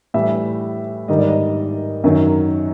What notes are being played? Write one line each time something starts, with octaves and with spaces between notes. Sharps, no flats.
A2 E3 G3 E5
G#2 D#3 G3 D#5
D5
D#5
F#2 D#3 F#3